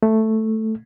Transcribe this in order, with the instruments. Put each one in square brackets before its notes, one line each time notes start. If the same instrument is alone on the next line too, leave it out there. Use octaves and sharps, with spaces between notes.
[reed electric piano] A3